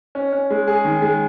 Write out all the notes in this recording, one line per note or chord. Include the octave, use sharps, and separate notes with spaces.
C#4
C#4
G#3
G#4
D#3
G#3